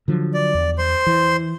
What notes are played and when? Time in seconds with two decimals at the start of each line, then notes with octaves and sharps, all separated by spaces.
0.08 D3 F3 F#3
0.34 D5
0.54 E2
0.78 C5 C6
1.06 E3